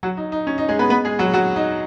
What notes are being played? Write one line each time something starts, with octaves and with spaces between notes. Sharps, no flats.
F#3 F#4
D#4
D#4
C#4
D#4
G#3 G#4
B3 B4
B3 B4
G#3 G#4
F#3 F#4
F#3 F#4
D#4